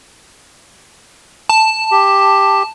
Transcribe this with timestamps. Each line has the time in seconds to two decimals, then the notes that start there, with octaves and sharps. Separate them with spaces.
1.49 A5
1.91 G4